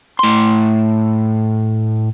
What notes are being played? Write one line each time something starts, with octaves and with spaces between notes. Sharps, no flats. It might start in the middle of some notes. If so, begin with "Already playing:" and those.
A2 C6